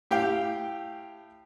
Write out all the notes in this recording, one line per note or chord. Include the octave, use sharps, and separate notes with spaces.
A2 G4 F5 G5